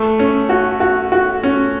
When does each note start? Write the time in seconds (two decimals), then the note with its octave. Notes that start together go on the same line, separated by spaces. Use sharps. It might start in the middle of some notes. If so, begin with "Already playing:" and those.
Already playing: A3
0.19 C#4
0.49 F#4
0.80 F#4
1.12 F#4
1.43 C#4